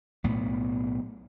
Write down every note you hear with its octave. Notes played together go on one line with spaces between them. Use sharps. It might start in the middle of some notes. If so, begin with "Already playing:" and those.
B1 A2 B3